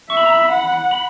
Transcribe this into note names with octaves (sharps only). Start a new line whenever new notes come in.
E5 C#6
B5
A#5
B5
F#5
B5